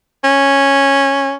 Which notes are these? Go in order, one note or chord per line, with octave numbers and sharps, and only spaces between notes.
C#4